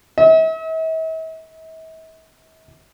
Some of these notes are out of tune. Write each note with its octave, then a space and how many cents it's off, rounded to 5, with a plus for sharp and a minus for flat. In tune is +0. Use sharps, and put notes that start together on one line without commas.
E5 -45